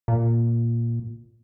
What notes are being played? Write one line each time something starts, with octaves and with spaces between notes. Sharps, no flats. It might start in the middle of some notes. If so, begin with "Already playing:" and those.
A#2